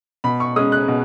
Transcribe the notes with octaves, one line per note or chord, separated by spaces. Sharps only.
B2 B5
C#6
G#3 C#4 D#6
F#6
B2